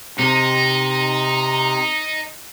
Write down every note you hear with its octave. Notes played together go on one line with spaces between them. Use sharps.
C3 D#4